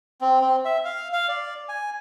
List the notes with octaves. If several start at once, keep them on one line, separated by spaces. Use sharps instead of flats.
C4
C4
E5
F5
F5
D5
G#5